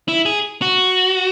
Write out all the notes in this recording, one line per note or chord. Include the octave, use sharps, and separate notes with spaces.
E4
G#4
F#4